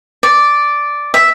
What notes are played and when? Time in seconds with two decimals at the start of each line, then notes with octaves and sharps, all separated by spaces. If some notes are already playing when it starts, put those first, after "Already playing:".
0.23 D5
1.14 E5